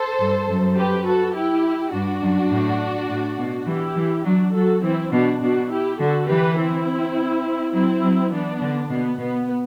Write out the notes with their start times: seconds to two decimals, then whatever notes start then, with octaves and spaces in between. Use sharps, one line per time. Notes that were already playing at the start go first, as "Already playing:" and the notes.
Already playing: A4 C5
0.19 G2
0.48 F#2
0.77 G4 B4
1.06 F#4 A4
1.34 E4 G4
1.93 G2 D4 F#4
2.22 F#2
2.51 A2
3.10 A2
3.39 B2
3.67 E3 E4 G4
3.96 E3
4.25 F#3 D4 F#4
4.54 F#3 F#4 A4
4.83 E3 C4 E4
5.12 B2 D4 F#4
5.41 B2 D4 F#4
5.70 E4 G4
5.99 D3 F#4 A4
6.28 E3 G4 B4
6.57 C4 E4
7.73 F#3 C4 E4
8.02 F#3
8.31 E3 B3 D4
8.61 D3
8.90 B2 B3
9.18 B2 B3